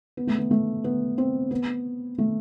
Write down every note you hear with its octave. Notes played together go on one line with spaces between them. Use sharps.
B3
A3
B3
A3
B3
C4
B3
A3